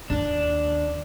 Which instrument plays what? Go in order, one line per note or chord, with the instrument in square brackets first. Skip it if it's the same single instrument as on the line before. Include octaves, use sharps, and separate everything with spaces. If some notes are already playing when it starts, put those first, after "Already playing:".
[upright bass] D#2 [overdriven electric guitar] D4